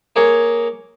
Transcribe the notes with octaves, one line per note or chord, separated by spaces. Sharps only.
A#3 G#4 A#4 C#5